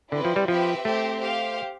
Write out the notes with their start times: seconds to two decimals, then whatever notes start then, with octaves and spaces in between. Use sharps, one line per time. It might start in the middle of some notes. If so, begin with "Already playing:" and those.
0.12 D3 C4 E4 B4 D5
0.25 F3
0.36 G3
0.48 F3 C4 G4 B4 E5
0.85 A3 C4 G4 C5
1.21 G4 C5 F5